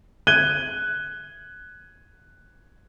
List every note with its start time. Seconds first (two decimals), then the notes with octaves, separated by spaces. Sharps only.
0.27 F#6 G#6 D#7 G7